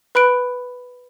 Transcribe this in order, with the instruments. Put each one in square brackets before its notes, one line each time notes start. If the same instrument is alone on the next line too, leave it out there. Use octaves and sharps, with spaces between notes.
[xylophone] B4 B5 F#6 D7